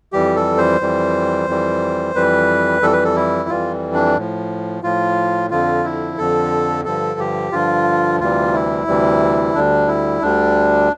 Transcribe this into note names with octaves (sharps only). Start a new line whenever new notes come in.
F2 E3 G3 G4
A4
C5
F2 E3 G3
F2 E3 G3
F2 E3 G3 B4
F2 E3 G3 A4
B4
A4
E4
F2 E3 G3 F4
D4
A2 F3
A2 F3 F4
F2 D3 F3 F4
E4
F2 D3 F3 A4
G2 D3 F3 A4
G4
G2 D3 F3 F4
D2 C3 E3 G3 F4
E4
D2 C3 E3 G3
D2 D3 G3 D4
E4
D2 D3 G3 D4